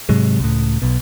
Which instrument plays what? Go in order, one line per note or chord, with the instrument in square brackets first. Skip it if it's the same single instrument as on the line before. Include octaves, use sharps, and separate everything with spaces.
[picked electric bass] G#2 C3 F#3 G#3
C#2 A2
B1 B2